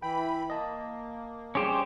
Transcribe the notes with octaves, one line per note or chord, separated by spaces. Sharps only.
E3 G5 B5
A#3 D#5 A5
G3 C#4 G4 G#4 C5 C6